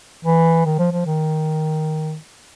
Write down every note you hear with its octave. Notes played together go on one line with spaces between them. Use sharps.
E3
D#3
F3
F3
D#3